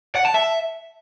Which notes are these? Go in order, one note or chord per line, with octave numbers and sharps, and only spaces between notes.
F#5
A5
E5